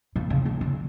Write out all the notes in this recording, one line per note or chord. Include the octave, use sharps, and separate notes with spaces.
A#2
C#3
C#3
D3